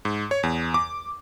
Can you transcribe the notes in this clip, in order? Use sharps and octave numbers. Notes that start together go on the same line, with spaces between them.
G#2
C#5
E2
D6